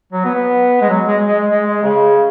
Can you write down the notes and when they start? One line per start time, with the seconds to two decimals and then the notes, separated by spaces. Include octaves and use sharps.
0.12 F#3
0.25 B3
0.35 B3
0.81 G#3
0.89 F#3
1.07 G#3
1.27 G#3
1.50 G#3
1.67 G#3
1.83 C#3